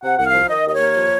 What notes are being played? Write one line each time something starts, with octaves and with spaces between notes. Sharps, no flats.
C3 F#5
C2 F#5
F5
F3
D#3 D#5
D#2 D#5
C#5
A#3
F3